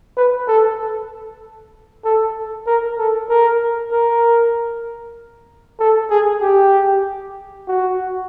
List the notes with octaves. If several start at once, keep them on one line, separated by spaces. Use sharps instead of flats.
B4
A4
A4
A#4
A4
A#4
A#4
A4
G#4
G4
F#4